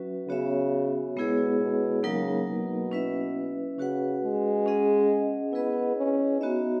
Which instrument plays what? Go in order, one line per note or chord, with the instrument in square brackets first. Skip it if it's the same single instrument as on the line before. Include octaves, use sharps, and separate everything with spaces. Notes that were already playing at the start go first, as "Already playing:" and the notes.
Already playing: [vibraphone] F#3 C#4 F#4 B4 E5
[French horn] C#3 [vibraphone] B3 F#4 C#5 E5
[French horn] B2 [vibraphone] G#3 B3 E4 G#4 C#5
[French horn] B2
[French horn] C#3 [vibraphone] F#3 A#3 D#4 A#4
[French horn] B2
[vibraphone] C#4 E4 B4 E5
[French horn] C#3 [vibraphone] C#4 F#4 B4 F#5
[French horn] G#3
[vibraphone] C#4 G#4 D#5 F#5
[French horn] B3 [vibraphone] E4 G#4 B4 D#5
[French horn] C#4
[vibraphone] B3 F#4 C#5 E5 [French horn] D#4